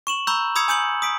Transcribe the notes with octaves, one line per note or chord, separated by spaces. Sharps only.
C#6 E7 F#7
A#5 B5 C#6 E6 G6
B5 D#6 E6 G#6 C#7
G#5 D#6 G6 C#7 F#7
D#6 B6 D7